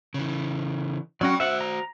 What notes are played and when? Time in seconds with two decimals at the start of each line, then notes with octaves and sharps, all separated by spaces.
0.14 C#3 E3
1.21 F#3 C#4 F#4 D5 G5
1.40 F#4 C5 E5 F#5
1.61 A#5